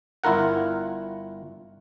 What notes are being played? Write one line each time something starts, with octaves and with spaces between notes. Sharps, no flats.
G1 E4 F4 A#4 F#5